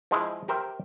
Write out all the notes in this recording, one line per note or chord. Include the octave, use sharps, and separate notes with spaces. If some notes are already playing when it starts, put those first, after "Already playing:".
F3 G#3 E4
G4 A#4 C5 E5 G5